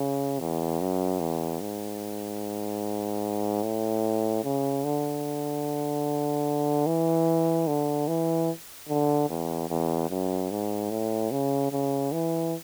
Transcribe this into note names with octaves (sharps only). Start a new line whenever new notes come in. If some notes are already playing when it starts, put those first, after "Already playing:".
Already playing: C#3
E2
F#2
E2
G#2
A2
C#3
D3
E3
D3
E3
D3
E2
E2
F#2
G#2
A2
C#3
C#3
E3